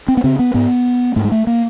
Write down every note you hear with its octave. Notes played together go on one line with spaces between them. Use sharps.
C4
B3
C#3 C4
B3
G#2 B3
G#2 A3
G#3
A3
A#3